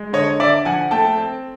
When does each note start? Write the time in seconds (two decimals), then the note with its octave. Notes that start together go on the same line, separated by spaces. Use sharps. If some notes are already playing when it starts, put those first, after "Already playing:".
Already playing: G#3
0.13 D3 C#5 D#5
0.39 D3 D5 E5
0.65 F3 F#5 G#5
0.91 A3 G5 A5
1.17 C4